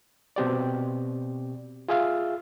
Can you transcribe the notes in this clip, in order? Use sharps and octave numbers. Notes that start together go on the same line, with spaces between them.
B2 C4 G4 D5
F4 G#4 E5 F5